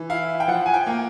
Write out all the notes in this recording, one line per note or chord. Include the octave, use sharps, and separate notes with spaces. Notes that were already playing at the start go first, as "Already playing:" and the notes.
Already playing: E3
E4 F5
G5
F3 F#5
G#5
G5
A#3